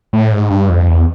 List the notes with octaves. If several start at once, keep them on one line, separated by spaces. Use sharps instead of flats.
A2
G#2
G2
F2
E2